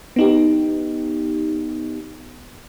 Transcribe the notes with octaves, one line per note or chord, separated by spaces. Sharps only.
B3 D#4 G4